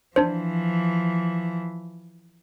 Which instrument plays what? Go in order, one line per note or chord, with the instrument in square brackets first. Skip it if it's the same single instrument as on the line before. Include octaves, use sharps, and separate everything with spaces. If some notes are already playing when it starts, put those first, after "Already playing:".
[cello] E3 F3 [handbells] D4 C5